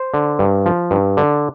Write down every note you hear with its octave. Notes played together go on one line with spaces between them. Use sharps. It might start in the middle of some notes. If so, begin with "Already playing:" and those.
Already playing: C5
D3
G2
F3
G2
D3